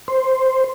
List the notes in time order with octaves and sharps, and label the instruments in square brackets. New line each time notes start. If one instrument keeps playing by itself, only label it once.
[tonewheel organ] C5